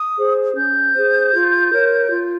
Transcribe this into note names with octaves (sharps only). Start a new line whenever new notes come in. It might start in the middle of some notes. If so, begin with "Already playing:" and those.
Already playing: D#6
G#4 C5
C#4 G6
G#4 C5
F4
A#4 C#5
F4